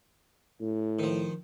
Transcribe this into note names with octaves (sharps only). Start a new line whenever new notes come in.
A2
D#3 F3